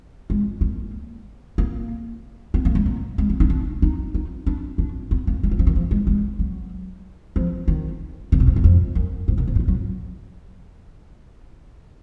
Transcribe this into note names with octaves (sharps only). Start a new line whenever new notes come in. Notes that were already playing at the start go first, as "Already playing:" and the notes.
G#3
A#3
A#3
B3
A#3
G#3
F#3
G#3
B3
D#4
D4
D#4
D#4
D4
D4
B3
A#3
G#3
F#3
F3
D#3
F3
G#3
G#3
F#3
F3
D#3
D3
B2
G#2
F#2
F2
F#2
G#2
A#2
G#2
B2
A#2
F#3